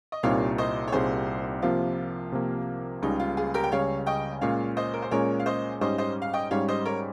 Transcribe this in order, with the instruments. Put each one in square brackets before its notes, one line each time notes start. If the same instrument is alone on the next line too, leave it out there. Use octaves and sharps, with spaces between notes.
[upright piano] D#5
[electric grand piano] C2 A#2 G3 C4 D#4 [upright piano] C#5 F5
[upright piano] C5 D#5
C#5
[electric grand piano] C2 A#2 G3 C4 D#4 [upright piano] G#4 C5
[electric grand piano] C3 F3 A#3 [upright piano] F4
[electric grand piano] C3 F3 A#3
[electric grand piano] C#2 C#3 G3 C#4 [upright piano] D#4
[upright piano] F4
F4 G#4
G4 A#4
G5
[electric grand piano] C#2 C#3 G3 C#4 [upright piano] C#5 F5
[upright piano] D#5 G5
[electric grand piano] A#2 G#3 C#4 [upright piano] C#5 F5
[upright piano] C5 D#5
A#4
C5
[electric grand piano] A#2 G#3 C#4 [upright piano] A#4 C#5
[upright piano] F5
C5 D#5
[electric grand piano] G#2 G3 C#4 [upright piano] C5 D#5
[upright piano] C5 D#5
F5
D#5 G5
[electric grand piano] G#2 G3 C#4 [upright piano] C#5 F5
[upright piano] C5 D#5
A#4 C#5